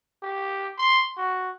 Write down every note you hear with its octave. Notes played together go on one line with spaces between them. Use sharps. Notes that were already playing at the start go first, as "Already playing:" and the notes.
G4
C6
F#4